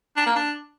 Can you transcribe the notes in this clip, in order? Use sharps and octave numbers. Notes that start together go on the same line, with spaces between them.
D4
A#3
D4